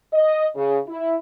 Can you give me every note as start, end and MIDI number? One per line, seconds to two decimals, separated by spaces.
0.13 0.48 75
0.55 0.79 49
0.88 1.17 64